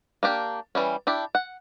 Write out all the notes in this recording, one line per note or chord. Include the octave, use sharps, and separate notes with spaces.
A#3 D4 G4
E3 G3 C#4
D4 E4 G4
F#5